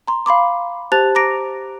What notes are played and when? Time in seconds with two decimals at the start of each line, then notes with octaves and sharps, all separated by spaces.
0.08 A#5 C6
0.26 F5 B5 C6 D6
0.92 G4 C5 A5 F#6 A6 F7
1.15 A#5 D6 A#6 D7